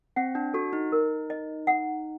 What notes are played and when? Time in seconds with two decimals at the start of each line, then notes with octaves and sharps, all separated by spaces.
0.16 C4 F#5
0.35 D4
0.54 F#4 A4
0.73 D#4
0.92 A#4
1.30 D#5
1.67 F#5